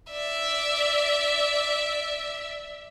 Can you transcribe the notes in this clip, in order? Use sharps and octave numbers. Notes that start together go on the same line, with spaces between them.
D5 E5